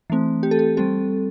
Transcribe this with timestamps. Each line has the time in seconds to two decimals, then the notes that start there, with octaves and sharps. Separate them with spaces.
0.10 E3 A3 C4
0.43 G4
0.51 A4
0.59 G4
0.77 G3 C4 A4